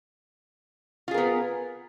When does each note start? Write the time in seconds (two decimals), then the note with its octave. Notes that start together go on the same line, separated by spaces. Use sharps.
1.08 F4
1.11 G#4
1.14 A#4
1.18 B3